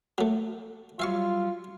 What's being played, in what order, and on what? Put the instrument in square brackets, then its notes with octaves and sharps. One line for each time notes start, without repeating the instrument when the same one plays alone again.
[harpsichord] F#3 A3
[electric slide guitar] F#3 G3 [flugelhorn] F4 [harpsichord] E5 F5 C#6